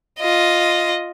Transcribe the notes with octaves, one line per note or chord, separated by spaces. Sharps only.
F4 D#5